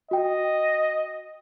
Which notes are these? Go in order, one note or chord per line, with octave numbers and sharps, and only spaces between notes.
F#4 D#5 G5